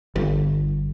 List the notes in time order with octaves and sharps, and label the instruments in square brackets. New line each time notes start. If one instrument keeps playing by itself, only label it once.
[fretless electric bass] G1